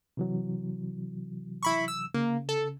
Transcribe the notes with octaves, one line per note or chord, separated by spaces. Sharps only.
C3 E3 F#3
E4 B5 C#6
E6
C#3 A#3
A4